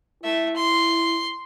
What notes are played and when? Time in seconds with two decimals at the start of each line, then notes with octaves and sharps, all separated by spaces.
0.24 A3 E4 E5
0.56 C6